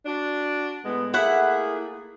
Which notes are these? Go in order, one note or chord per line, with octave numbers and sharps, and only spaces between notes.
D4 F#4
A2 G#3 B3
A3 A#3 E4 G#4 F#5